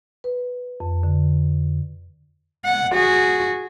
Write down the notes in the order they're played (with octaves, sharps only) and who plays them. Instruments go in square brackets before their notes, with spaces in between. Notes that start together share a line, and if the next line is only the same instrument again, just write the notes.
[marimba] B4
F2
D3
[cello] F#5
F#4 G#4